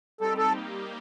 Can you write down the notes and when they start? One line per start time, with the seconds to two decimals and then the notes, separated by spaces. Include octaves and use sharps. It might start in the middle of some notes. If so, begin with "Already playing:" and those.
0.20 G3 C4 D#4 G4 A4
0.37 A4
0.55 G3 A#3 D#4 G4